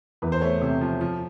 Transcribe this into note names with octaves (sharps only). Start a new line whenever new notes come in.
E2 B4
C5
A3 C#5
C3
F3
F3